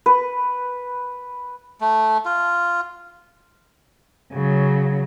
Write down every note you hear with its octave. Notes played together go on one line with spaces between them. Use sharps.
B4
A3
F4
C#3 F#3